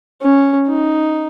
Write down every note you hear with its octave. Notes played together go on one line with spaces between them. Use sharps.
C#4
D#4